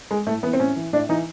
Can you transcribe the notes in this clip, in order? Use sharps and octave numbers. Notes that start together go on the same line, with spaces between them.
G#3
A2 A3
E3 B3
C4
A2 C#4
E3
A2 D4
E3 D#4